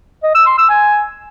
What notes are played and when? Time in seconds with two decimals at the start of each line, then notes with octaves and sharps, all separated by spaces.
0.23 D#5
0.35 E6
0.47 C6
0.58 E6
0.70 G#5